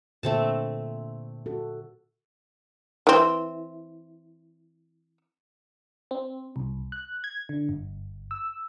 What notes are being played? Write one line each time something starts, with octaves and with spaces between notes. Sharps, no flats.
A#2 D3 A3 C4 A5
F#4 A4
E3 C4
C4
C2
F#6
G#6
D3
G1
E6